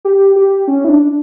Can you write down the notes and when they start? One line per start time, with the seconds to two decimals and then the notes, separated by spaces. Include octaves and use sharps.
0.05 G4
0.36 G4
0.68 C#4
0.85 E4
0.89 D4